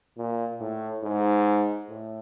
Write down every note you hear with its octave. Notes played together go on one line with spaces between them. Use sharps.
A#2
A2
G#2
A2